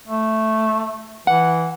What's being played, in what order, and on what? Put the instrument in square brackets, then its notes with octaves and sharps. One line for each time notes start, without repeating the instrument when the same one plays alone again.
[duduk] A3
[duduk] E3 [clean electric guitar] F#5